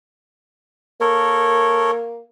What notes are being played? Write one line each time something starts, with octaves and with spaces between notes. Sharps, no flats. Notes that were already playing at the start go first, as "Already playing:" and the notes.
A#3 A4 A#4 C#5